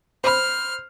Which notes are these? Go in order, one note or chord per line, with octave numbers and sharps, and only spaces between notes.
C5 B5 F6